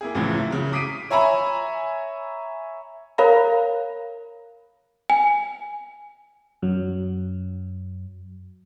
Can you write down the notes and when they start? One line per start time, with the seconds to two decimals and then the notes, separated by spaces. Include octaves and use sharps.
0.01 A#3 E4 G#4
0.15 C#2 F#2 A2 E3 F3
0.37 E4
0.51 C#3 F#3
0.72 D6 D#6 B6 C7 D7 D#7
1.10 C#5 E5 G#5 A#5 B5
3.18 A#4 C#5 F5 A#5 B5
5.10 G#5
6.62 F#2 F#3